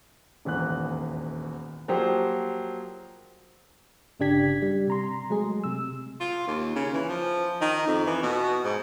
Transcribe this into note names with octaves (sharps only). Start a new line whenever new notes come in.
D#1 G#1 E2 F#6
F3 F#3 A#3 G4 G#4 C5
G1 C#3 D4 G4 G#6 B6
G3
C3 A#5 C6
F#3 G#3 A3 G#4
C3 E6
F4
D#2
C#3
E3
F3
D#3
F2
E3
B2
G#2